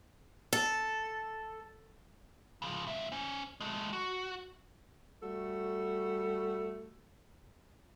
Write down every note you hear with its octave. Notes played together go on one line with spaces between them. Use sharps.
A4
C#3 F3
C#2 E5
C#4 C5
G#3 A3
F#4
G3 A3 F#4 A4